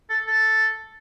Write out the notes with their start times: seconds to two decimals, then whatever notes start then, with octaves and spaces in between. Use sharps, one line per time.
0.10 A4
0.27 A4